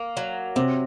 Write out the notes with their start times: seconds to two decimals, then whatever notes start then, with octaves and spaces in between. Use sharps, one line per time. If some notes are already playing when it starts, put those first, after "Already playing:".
Already playing: A#3
0.17 F#3
0.56 C3 C4